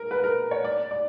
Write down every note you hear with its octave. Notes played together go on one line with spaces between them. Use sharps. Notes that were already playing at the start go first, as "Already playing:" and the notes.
Already playing: A#4
B4
A#4
C#5
D5
D5